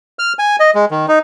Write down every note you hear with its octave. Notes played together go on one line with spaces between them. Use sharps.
F6
G#5
D#5
G#3
D#3
D#4